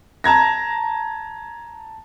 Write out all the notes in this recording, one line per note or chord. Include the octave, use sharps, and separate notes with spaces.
A5 A#5 G#6 A#6